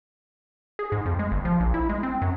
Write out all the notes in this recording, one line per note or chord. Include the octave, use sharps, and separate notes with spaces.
G#4
G#2
F2
G#3
G1
F3
A#1
E4
G#3
C4
F#2